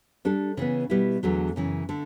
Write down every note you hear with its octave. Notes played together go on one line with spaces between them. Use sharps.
G3 D4 A4
C#3 E3 B3
B2 G3 B3 E4
E2 D3 F#3 A3
F#2 C#3 E3
D3 A3